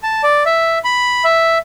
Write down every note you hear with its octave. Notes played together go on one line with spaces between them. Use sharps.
A5
D5
E5
B5
E5